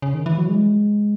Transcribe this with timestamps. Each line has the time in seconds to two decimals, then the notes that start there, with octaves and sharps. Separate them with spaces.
0.02 C#3
0.14 D#3
0.26 E3
0.38 F#3
0.49 G#3